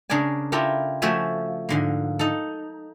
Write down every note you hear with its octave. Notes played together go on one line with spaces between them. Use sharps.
C#3 D4 A#4 D5 G#5
E4 F4 G4 A4 A#4
F3 A3 F#4 E5 G#5
G#2 D3 A#3
D#4 A4